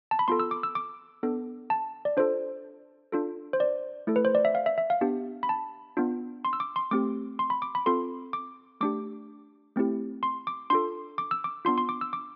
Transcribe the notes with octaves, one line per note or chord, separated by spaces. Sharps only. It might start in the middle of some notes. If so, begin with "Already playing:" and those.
A5
B5
B3 F4 A4 C6
E6
D6
E6
D6
B3 D4 A4
A5
D5
D4 F4 A4 C5
D4 F4 A4
C5
D5
A3 E4 A4
B4
C5
D5
E5
F5
E5
E5
F5
B3 D4 G4
B5
A5
B3 D4 F4
C6
E6
D6
C6
A3 C4 G4 D6
C6
B5
D6
B5
C4 F4 A4 C6
D6
A3 D4 G4 D6
A3 C4 E4 G4
C6
D6
D4 F4 A4 C6
D6
E6
D6
B3 D4 F4 C6
C6
D6
E6
D6